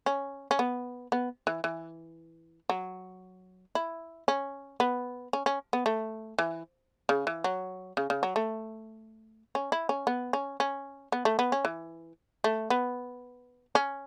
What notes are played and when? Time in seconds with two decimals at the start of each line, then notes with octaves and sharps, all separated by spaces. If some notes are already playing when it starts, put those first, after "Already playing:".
0.06 C#4
0.51 C#4
0.59 B3
1.12 B3
1.47 E3
1.64 E3
2.69 F#3
3.75 E4
4.28 C#4
4.80 B3
5.33 C#4
5.46 C#4
5.73 B3
5.86 A3
6.39 E3
7.09 C#3
7.27 E3
7.44 F#3
7.97 C#3
8.10 C#3
8.23 F#3
8.36 A3
9.55 C#4
9.72 E4
9.89 C#4
10.07 B3
10.33 C#4
10.60 C#4
11.12 B3
11.25 A3
11.39 B3
11.52 C#4
11.65 E3
12.44 A3
12.70 B3
13.75 C#4